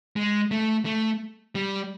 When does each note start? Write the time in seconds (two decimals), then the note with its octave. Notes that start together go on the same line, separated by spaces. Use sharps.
0.16 G#3
0.51 A3
0.85 A3
1.55 G3